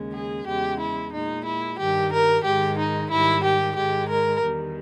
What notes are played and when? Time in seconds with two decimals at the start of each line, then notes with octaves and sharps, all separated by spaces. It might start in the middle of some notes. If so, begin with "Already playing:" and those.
Already playing: D#2 C#3 G#3
0.13 G#4
0.47 E2 C#3 G#3 G4
0.80 E4
1.12 A#2 G#3 D#4
1.45 E4
1.78 G2 D#3 G3 G4
2.12 A#4
2.44 G#2 D#3 G#3 G4
2.78 D#4
3.11 G#2 D#3 G3 E4
3.43 G4
3.76 G#2 D#3 G#3 G4
4.09 A#4
4.42 E2 D#3 G3